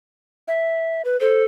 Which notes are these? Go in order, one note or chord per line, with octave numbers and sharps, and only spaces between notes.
E5
B4
A4 C5